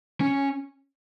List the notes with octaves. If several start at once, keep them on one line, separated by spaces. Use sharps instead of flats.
C#4